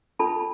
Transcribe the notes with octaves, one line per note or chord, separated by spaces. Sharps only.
D4 F4 A4 A5 B5